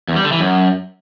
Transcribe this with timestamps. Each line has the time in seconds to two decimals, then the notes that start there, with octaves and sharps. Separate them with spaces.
0.08 E2
0.16 G3
0.24 D3
0.32 E3
0.40 F#2